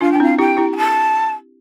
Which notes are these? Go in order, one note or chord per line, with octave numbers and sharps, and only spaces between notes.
D4 F4 F5
D4 G5
C4 E4 F5
E4 G4 G5
E4 G4
G5
A5